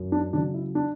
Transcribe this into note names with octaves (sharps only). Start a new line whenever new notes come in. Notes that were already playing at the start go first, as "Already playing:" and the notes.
Already playing: F#2
D4
C#3 F#3 D4
E4
D4